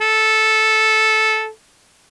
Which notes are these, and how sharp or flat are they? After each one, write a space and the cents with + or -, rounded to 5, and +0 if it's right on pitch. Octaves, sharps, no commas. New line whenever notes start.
A4 -10